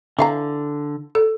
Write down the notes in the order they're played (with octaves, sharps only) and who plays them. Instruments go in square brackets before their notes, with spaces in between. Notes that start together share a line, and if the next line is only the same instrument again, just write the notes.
[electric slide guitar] D3 [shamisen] E3 F5 A#5
[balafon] A4